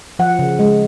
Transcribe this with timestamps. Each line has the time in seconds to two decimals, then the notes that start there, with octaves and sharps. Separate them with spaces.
0.19 F3 F#5
0.39 C#3
0.59 G#3